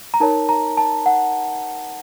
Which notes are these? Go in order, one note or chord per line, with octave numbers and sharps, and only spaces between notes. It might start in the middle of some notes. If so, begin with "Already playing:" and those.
A#5
D#4 A#4 C#5 A5
A#5
A5
F#5